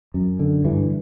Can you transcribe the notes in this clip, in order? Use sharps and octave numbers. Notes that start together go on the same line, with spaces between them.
F#2
D3
G2 E3